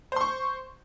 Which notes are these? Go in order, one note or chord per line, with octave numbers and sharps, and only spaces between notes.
C5 C6 C#6